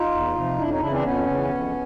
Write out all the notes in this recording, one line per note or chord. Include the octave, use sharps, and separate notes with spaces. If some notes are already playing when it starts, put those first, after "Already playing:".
Already playing: D#4 F4
E2
C3 F3
F2 D4 E4
C#4 D#4
C#3 D4 E4
E3
C4 D4
F2 B3 C#4
C#3 E3
F2